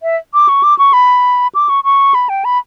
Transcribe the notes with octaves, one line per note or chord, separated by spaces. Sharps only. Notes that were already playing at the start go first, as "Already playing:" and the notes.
E5
D6
C#6
D6
C#6
B5
D6
C#6
C#6
B5
G5
B5